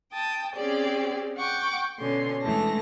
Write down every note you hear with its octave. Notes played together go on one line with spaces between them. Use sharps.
G5 A5 D#6
C4 C#4 G4 G#4 D5
F#5 G5 C#6 D6
B2 D3 C#4 C6
D2 E3 G#3 A3 A5 A#6